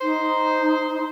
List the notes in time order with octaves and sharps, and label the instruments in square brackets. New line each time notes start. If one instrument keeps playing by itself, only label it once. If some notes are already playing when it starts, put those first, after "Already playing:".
[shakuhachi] D#4 [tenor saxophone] C5